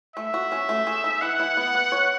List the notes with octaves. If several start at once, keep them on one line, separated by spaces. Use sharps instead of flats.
A3 E5
F#4
C#4
A3
G#4
D#4
E3 F#5
E4
B3
B3
C#5